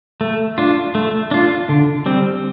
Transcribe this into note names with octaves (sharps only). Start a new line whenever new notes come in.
A3
D4 F4
A3
D4 F4
D3
G3 C4